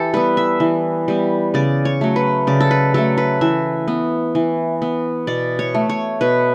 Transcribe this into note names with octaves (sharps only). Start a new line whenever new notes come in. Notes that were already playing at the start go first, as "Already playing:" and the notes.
Already playing: E3 G4 A4
G3 B3 B4
E5
E3
G3 B3
C#3 D5
C#5
F#3 A3
B4
C#3 D5
A4
B4
F#3 A3 A4
B4
E3 E5
B3
E3
B3
B2 D5
C#5
A3
C#5
B2 B4